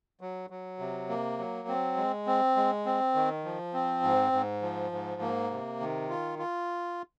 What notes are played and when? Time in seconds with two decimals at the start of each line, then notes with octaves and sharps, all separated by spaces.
0.21 F#3
0.50 F#3
0.79 C3
1.09 A#3
1.38 F#3
1.68 C4
1.97 G#3
2.27 C4
2.56 G#3
2.86 C4
3.15 D#3
3.44 F3
3.74 C4
4.03 G#2
4.32 G#2
4.62 F3
4.92 G#2
5.22 A#3
5.51 C3
5.80 D#3
6.10 F4
6.39 F4